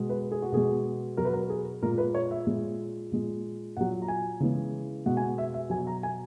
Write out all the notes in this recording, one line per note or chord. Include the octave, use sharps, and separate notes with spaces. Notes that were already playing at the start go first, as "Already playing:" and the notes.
Already playing: B2 G#3
B4
G#4
F#4
B2 G#3 G#4
B2 F#3 A#4
B4
A#4
G#4
A#2 G#3 A#4
B4
C#5
E5
A#2 G#3
A#2 G#3
A#2 F#3 F#5
A#5
G#5
C#3 E3 G#3
B2 G#3 F#5
G#5
F#5
E5
E5
F#3 G#5
B2
A#5
G#5